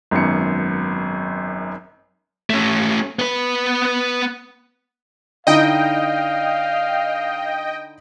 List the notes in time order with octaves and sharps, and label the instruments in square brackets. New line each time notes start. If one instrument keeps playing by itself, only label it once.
[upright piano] G#1 F#2 B3 C#7
[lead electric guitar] A3 C#4
B3 B4
[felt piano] D3 D#4 E4 [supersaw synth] D#5 G5 [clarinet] F5